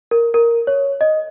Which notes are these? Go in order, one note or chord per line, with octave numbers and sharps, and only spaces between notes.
A#4
A#4
C#5
D#5